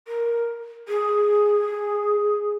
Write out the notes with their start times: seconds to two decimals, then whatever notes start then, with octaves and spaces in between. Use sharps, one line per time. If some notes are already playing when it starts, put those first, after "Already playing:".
0.08 A#4
0.88 G#4